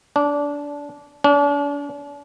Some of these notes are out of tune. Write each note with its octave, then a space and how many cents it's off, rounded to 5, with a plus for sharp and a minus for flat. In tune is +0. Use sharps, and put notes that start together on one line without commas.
D4 -20
D4 -40